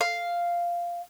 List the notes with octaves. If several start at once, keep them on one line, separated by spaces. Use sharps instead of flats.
F5